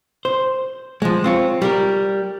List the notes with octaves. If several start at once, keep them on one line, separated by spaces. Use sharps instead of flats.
C5
F3 G#3
C4 F4 C#5
G3 G4 A#4